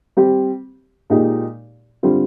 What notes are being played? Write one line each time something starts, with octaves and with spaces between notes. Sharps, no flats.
G3 C4 G4
A#2 G#3 D#4 G4
D3 G3 C4 F4